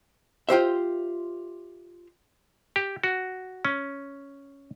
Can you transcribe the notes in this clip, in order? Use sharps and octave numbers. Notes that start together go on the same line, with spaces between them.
F4 G4 C5 E5
G4
F#4
C#4